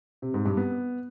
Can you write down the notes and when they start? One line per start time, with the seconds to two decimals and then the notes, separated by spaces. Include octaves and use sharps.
0.22 C3
0.34 G#2
0.46 G2
0.57 B3